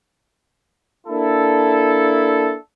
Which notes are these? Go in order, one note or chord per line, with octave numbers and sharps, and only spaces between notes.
A#3 D4 E4 A4